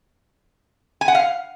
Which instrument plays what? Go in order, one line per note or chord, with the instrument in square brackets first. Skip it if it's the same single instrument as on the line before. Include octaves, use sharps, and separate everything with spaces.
[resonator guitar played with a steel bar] G#5
F#5
F5